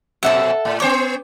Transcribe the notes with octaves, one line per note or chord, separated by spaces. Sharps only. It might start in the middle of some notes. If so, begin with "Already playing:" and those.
F#2 B2 A4 E5 F#5
A2
B3 C5 C#5 D6